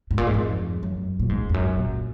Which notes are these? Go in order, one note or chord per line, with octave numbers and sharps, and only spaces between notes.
G#2
A#2
G#2
F2
F#2
A#2
G#2
F2
F#2
A#2